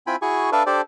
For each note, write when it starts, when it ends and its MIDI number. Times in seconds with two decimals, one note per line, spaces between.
0.07 0.16 60
0.07 0.16 64
0.07 0.16 65
0.07 0.16 79
0.07 0.16 80
0.07 0.16 83
0.22 0.50 64
0.22 0.50 66
0.22 0.50 68
0.22 0.50 80
0.22 0.50 85
0.52 0.63 62
0.52 0.63 69
0.52 0.63 71
0.52 0.63 74
0.52 0.63 76
0.52 0.63 77
0.66 0.81 62
0.66 0.81 67
0.66 0.81 69
0.66 0.81 72
0.66 0.81 74